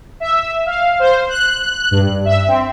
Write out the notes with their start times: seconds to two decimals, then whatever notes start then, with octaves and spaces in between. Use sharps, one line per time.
0.20 E5
0.66 F5
0.99 C5
1.29 F#6
1.91 G2
2.25 E5
2.47 C4